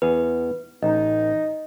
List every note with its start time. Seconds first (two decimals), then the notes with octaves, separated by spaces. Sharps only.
0.02 E2 G#4 B4
0.83 A1 D#4 D#5